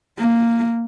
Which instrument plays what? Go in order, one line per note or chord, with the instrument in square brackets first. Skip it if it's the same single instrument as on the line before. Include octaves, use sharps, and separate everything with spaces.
[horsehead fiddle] A#3